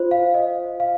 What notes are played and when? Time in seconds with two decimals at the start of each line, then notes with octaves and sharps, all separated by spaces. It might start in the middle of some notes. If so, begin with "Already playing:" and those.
Already playing: F4 C5
0.11 F5
0.34 D#5
0.80 F5